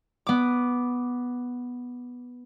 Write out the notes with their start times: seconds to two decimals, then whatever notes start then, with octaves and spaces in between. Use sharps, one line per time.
0.27 B3 D6